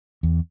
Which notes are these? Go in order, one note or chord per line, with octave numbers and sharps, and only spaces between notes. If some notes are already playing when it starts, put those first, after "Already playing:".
E2